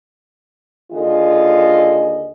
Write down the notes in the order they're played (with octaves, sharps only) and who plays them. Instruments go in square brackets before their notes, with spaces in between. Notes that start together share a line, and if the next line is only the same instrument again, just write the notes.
[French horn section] D#2 D3 F4 G#4 D#5